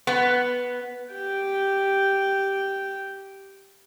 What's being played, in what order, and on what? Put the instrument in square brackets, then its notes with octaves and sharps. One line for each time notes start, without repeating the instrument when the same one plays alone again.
[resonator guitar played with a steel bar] B3
[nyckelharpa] G4 G5